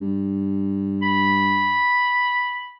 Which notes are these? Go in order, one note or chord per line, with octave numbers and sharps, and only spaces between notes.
G2
B5